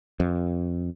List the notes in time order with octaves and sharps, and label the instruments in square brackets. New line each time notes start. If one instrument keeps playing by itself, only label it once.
[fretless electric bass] F2